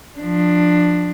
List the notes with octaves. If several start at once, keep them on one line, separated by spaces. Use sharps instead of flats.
F3 D4